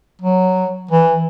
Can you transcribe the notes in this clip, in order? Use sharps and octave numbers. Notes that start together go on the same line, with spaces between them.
F#3
E3